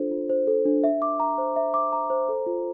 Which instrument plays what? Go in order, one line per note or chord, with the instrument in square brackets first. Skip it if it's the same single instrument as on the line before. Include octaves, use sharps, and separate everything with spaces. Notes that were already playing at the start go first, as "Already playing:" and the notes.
Already playing: [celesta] D4 F4 A4 C5
F4
C5
A4
D4
E5
D6
A#5
C5
E5
D6
A#5
C5
A4
F4